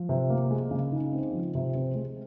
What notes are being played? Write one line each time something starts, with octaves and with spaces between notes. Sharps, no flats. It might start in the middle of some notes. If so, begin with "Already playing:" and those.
Already playing: F3
C3
A#3
G#3
C#3
D#4
C4
F3
C3
C4
G#3